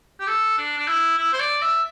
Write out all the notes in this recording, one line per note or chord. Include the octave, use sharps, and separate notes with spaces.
G4
A4
D4
D4
E4
E4
C5
D5
E5